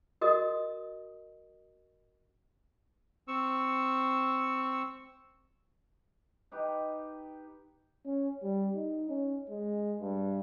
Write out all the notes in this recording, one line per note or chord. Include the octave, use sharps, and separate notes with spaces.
F#4 A#4 D#5 D#6
C4 C#6 E6
D#4 G4 B4
C#4
G3
D#4
C#4
G#3
G2